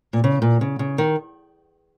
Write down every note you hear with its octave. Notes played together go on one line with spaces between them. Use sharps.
A#2
C#3
A#2
C#3
C#3
D#3